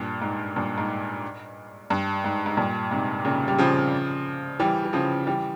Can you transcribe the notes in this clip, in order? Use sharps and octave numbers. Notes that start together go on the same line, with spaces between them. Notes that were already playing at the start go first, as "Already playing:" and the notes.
Already playing: G2 A#2
G#2
G2 A#2
G#2
G2
G#2
G#2
G2 A#2
G#2 C3
A#2 C#3
G3
C#3 F3
E3 G3
E3
C#3 F3
E3 G3